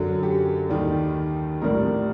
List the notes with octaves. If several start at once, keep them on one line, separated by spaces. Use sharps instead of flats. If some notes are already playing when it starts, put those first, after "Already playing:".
Already playing: F#2 D3 F#3 A4
G4
D#2 D#3 G3
A#1 A2 G3 A#4